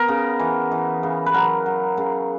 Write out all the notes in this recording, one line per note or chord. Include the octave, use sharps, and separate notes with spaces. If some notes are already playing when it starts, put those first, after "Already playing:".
Already playing: B3 A#4
C#3
E3
E3
C#3
B4
F#3 A#4
F#3
C#3